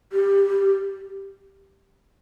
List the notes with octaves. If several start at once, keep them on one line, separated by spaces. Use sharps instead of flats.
G4